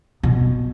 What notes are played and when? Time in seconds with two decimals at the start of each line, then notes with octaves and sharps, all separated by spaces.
0.23 B2